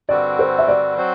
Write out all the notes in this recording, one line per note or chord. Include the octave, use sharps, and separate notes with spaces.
G2 D3 G3 C4 F#4 D5
C5
E5
D5
F#3 C4 F#4 C5